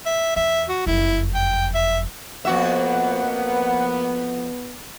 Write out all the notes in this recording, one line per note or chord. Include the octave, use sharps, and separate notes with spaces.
E5
E2 E5
F#4
F#1 F2 E4
G5
E5
F2 A#3 B3 F#4 E5 F#5